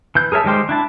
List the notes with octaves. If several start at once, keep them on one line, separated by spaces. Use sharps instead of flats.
E3 G6
G#4 A#4 C#5 E5 A5
D#3 G3 G#3 G4 C5
D4 E4 A5